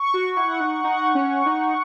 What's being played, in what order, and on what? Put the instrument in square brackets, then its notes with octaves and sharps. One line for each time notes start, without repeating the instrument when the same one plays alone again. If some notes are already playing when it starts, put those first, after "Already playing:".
Already playing: [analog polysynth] C#6
[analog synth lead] F#4
[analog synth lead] E4 [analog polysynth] F#5
[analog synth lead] D#4
[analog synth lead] D#4 [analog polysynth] F#5
[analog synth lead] C#4
D#4